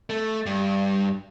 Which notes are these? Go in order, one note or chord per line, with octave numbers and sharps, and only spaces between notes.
A3
G2